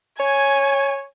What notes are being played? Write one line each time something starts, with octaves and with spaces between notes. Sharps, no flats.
C#5 G#5